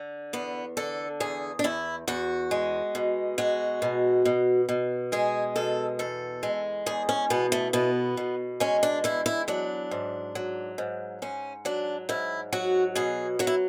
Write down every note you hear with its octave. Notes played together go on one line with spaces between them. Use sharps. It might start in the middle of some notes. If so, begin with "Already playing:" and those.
Already playing: D3
E2 B3
D3 A4
E2 G#4
D4
E2 E4
E2 F#4
G#3
B2
G#3 F#4
B2
B2
B2
G#3 G#4
B2 A4
E2 A4
G#3
E2 G#4
C#4
B2 B3
A3
B2 B3
B2
G#3 C#4
D4
E2 E4
E4
F#3 D4
G#2
F#3
G#2
G#2 C#4
F#3 D4
G#2 E4
F#3 F#4
B2 G#4
F#3 F#4
E4